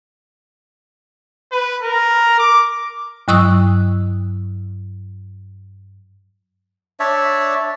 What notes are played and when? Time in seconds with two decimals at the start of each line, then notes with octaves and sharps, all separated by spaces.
1.52 B4
1.82 A#4
2.39 D6
3.28 G2 F#3 C#6 D#6 E6 F#6
7.00 D4 C#5 D5 E5